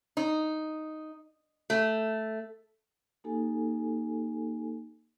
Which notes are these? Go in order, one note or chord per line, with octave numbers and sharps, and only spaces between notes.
D#4
A3
A#3 D#4 G4 A4 G#5